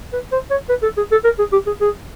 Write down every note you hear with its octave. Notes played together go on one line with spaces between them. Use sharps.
B4
C5
C#5
B4
A4
G#4
A4
A#4
G#4
G4
G#4
G#4